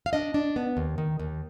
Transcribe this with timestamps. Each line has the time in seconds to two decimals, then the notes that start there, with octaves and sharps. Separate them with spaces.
0.06 F5
0.13 D4 D#5
0.34 D4
0.56 B3
0.77 D#2
0.98 D#3
1.19 D#2